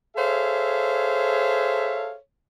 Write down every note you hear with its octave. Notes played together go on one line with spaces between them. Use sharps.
G#4 A4 C5 C#5 E5 F5